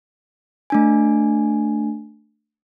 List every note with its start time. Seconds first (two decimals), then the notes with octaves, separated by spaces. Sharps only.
0.70 A3 D4 G#5